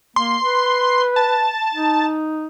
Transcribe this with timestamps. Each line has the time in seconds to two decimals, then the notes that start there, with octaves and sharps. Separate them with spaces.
0.16 A#3 C6
0.42 B4
1.16 A5
1.74 D#4